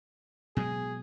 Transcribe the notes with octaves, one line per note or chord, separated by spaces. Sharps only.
B2 F#3 G#3 G#4